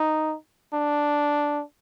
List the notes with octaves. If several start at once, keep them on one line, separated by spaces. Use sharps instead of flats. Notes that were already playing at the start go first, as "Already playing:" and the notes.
Already playing: D#4
D4